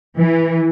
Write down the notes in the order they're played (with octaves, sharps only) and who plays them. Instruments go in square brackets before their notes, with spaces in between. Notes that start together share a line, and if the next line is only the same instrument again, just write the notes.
[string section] E3